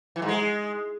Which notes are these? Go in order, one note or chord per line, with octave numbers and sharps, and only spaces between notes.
E3
G#2
G#3